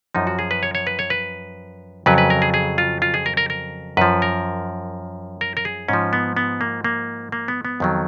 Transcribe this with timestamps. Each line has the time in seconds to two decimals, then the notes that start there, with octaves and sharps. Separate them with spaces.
0.15 F#2 F3 D#4
0.27 F#4
0.39 G#4
0.51 B4
0.63 C#5
0.75 C#5
0.87 B4
0.99 C#5
1.10 B4
2.06 F2 C#3 F#3 B4
2.18 B4
2.30 A#4
2.42 G#4
2.54 G#4
2.78 F4
3.02 F4
3.14 G#4
3.26 A#4
3.37 A#4
3.50 A#4
3.97 F#2 F3 B4
4.22 A#4
5.41 A#4
5.57 A#4
5.65 G#4
5.88 G#2 F3 C#4
6.13 B3
6.37 B3
6.61 A#3
6.84 A#3
7.32 A#3
7.48 B3
7.65 B3
7.80 F2 D#3 F#3